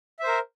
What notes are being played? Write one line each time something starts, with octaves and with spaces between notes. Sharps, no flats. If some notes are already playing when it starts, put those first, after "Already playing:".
A#4 C5 E5